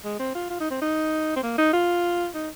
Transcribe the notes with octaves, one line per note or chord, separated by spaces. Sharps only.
G#3
C4
F4
F4
D#4
C4
D#4
C4
A#3
D#4
F4
D#4